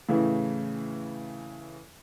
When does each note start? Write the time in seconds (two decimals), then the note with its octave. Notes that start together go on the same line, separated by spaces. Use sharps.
0.09 A2 C#3 E3